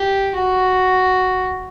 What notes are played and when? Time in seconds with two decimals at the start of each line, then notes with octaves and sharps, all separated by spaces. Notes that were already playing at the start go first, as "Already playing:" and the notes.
Already playing: G4
0.36 F#4